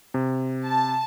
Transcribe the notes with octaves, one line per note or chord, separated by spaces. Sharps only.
C3
A5